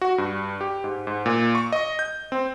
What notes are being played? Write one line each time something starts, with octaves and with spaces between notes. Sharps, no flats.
F#4
G2
G4
G#2
G#2
A#2
C#6
D#5
G6
C4